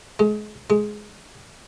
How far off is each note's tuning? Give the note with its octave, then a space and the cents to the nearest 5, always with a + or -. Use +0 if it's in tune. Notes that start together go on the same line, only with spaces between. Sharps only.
G#3 +30
G#3 +10